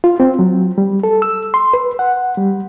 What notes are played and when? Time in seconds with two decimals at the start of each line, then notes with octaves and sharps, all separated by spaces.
0.04 F4
0.20 C4
0.39 F#3
0.78 G3
1.03 A4
1.22 E6
1.54 C6
1.73 B4
1.99 F#5
2.37 G3